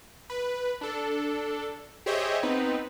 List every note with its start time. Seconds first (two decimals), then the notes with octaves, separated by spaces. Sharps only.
0.30 B4
0.81 D4 A4
2.06 G4 G#4 C5 C#5 D#5 E5
2.43 B3 C4 D#4 B4